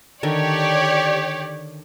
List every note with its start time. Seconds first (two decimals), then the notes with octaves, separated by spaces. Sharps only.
0.23 D3 D#3 G4 C#5 D5